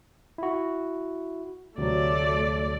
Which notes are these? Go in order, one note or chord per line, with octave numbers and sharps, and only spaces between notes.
E4 F#4
D2 C3 F#3 A3 D5